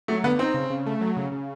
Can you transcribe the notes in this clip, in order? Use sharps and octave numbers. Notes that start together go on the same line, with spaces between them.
F#3 A3
D3 B3
C4 D#4
C#3
C#3
A3
F#3
C#3
C#3